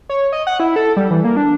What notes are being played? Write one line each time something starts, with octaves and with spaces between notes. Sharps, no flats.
C#5
D#5
F#5
E4
A4
G3
E3
A#3
D4